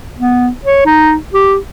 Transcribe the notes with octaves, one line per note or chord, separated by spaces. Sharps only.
B3
C#5
D#4
G4